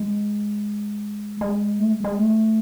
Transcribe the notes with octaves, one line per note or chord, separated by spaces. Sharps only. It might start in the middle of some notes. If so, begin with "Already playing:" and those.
Already playing: G#3
G#3
A3
G#3
G#3
A3